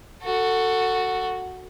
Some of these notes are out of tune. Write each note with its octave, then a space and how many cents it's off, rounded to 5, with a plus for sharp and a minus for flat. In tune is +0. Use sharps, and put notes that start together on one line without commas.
F#4 +0 A4 +25